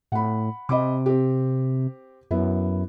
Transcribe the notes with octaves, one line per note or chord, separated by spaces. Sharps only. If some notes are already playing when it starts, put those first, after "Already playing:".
A2 F#5 B5
C3 D#5 B5 D6
C4 G4
F#2 B3 E4